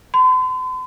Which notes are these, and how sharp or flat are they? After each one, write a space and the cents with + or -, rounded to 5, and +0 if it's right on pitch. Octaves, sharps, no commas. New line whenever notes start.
C6 -45